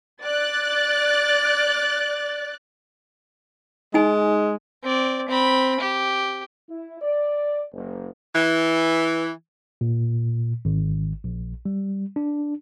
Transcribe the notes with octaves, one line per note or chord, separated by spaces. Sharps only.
D5 F#6 A6
G#3 D#4 G#5
C4 D5
C4 B5
G4
E4
D5
F#1
E3
A#2
G#1
A#1
G3
D4